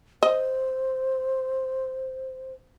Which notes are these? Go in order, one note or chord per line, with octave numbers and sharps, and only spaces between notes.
C5 D#5